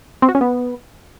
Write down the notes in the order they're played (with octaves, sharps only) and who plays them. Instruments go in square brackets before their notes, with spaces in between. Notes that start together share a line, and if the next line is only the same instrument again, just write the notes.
[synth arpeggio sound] C4
F#4
C#4
B3